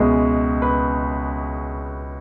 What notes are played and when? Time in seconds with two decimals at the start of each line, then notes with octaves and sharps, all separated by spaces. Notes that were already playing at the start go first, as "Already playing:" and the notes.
Already playing: C#2 B2 G#3 E5
0.62 B4